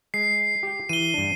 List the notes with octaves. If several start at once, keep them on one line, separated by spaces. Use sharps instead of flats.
G#3 C7
G4 G5
E3 D#7 G7
G2 D4